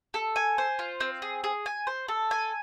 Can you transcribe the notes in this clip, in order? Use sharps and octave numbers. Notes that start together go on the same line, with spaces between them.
A4
G#5
C5
F4
C4
G#4
G#4
G#5
C5
A4
G#5